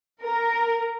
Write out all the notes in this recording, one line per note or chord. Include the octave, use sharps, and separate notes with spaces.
A#4